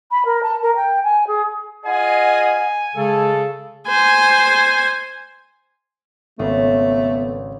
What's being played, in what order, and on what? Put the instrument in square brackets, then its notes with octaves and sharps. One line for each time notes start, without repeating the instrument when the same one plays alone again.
[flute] B5
A#4
A5
A#4
G5
G#5
G#4
[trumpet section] F4 G#4 D#5 [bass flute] F#5 [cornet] G#5
[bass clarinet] C#3 [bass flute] G#3 [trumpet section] A4
[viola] C5 G#5
[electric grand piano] G#1 [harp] C#3 [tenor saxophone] A3 [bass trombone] B3